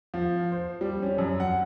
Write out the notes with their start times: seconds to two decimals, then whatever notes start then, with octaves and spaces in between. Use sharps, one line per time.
0.14 F3
0.52 C5
0.81 G3
1.02 C#4
1.18 F#2
1.40 F#5